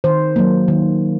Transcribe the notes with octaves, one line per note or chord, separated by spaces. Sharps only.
D#3 C5
F#3 A#3
D#3